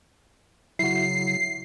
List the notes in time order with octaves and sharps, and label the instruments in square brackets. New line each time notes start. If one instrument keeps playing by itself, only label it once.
[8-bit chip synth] C#3 F#3 [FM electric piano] E4 F#4 [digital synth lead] C7